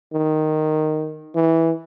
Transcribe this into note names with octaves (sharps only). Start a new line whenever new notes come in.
D#3
E3